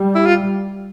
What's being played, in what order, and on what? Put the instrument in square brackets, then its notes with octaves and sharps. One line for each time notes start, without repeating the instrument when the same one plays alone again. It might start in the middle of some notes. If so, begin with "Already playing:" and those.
Already playing: [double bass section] G3
[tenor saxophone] E4
F4